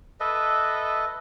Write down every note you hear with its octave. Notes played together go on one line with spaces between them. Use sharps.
A4 B4 D#5 E5